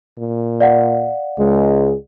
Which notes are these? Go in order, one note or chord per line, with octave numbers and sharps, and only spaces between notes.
A#2
D5 F5 F#5
C#2 G#3